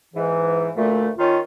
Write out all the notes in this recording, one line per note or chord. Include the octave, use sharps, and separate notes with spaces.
G#2 E3
D2 A#2 A3
D#3 C#4 F4